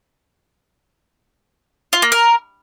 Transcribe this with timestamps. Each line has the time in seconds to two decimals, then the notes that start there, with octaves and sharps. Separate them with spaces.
1.93 F4
2.02 A#3
2.12 A#4